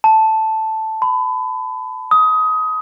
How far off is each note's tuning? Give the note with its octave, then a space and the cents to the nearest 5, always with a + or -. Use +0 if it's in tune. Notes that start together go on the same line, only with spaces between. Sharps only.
A5 +0
B5 +25
D#6 +20